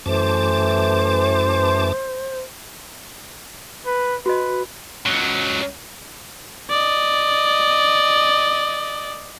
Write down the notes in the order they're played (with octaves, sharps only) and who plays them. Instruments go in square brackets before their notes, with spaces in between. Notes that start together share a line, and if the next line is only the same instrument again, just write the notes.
[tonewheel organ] F#2 A5 D6 [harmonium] E3 A3 [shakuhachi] C5
[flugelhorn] B4
[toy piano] F#4 D#5 [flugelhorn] B4
[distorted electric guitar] C#2 F#3
[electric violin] D5 D#5